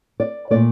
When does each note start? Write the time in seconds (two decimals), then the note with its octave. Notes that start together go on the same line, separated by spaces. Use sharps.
0.20 D5
0.50 A#2 A3 D5